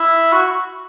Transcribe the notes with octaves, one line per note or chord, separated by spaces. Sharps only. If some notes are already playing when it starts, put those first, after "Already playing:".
Already playing: E4
F#4